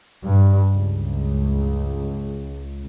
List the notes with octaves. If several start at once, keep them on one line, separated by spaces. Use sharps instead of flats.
G2
C#2